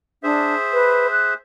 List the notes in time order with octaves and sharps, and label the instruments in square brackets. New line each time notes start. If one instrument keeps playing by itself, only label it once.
[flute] D4 [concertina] G#4 C5 E5
[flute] B4
F#6